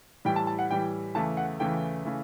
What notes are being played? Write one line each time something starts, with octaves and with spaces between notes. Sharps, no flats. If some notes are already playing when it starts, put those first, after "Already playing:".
A2 E3 G3 G5
A5
A5
F#5
A2 E3 G3 G5
E2 C#3 E3 A3 A5
F#5
E2 C#3 E3 A3 G5
C#3 E3 A3